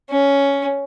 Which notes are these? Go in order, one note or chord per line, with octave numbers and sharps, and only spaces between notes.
C#4